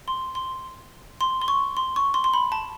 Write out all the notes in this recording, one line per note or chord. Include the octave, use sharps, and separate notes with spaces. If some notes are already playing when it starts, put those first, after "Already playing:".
C6
C6
C6
C6
C#6
C6
C#6
C6
C6
B5
A5